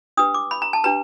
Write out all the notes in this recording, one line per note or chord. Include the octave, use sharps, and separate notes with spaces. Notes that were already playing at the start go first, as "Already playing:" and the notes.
D4 G4 B4 D#6
D6
B5
A#5
A5
D4 G4 B4 A#5